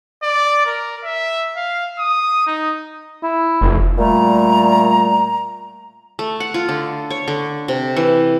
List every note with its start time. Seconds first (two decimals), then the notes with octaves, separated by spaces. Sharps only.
0.23 D5
0.66 A#4
1.04 E5
1.56 F5
1.99 D#6
2.47 D#4
3.23 E4
3.61 F1
3.98 A#2 G3 A3 A#5
6.19 A3
6.40 F#5
6.54 F4
6.69 D3
7.10 C#5
7.28 D3
7.68 C3
7.97 E3